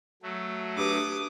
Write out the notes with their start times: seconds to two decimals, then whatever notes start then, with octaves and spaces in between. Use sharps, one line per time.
0.23 F#3 A3
0.77 D4 G4 B4 D6 D#6